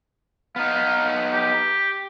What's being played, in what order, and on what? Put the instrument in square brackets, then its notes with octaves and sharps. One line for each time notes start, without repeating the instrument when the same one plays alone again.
[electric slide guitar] B3 D#4 [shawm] F5
[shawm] G4